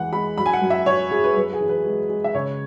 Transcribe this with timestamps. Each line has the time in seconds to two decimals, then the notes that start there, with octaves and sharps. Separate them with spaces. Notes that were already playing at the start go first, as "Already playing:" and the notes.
Already playing: E2 E3 G#3 F#5
0.12 G#3 B5
0.38 F#2 B5
0.46 G#5
0.53 F#5
0.62 F#2
0.70 E5
0.86 F#3 C#5
1.11 F#3 G#4
1.24 B4
1.36 F#2 B4
1.53 G#4
1.61 E3
1.69 B4
1.86 G#3
2.09 G#3
2.24 E5
2.34 C#3 C#5